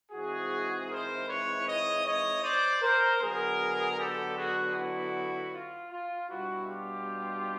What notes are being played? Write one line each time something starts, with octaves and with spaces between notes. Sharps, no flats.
G#2 E3 G#3 C4 E4 F#4 G#4
A#4 C5
B4 C#5
C#5 D#5
C#5 D#5
C5 D5
A#4 C5
D3 F#3 B3 G#4 A#4
G4 A4
F#4 G#4
E4 F#4
F4
F4
B2 G3 B3 D4 E4 F#4
F4 G4